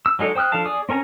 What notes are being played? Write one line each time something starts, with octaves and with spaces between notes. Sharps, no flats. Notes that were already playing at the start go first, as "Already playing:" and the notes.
E6
F#3 G#3 D#4 A4 D5
C5 G5 D#6 F6 F#6
F3 D4 A4 F5 A5
G#4 D5 D#6
C4 C#4 A#4 G#5 A#5